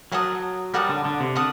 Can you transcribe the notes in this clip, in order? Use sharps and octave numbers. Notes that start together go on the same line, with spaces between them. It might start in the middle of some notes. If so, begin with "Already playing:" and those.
F#3 A#4 F#5 A5 D#6
G3 A#4 F#5 A5 D#6
D3
D3
C3
D3 A#4 F#5 A5 D#6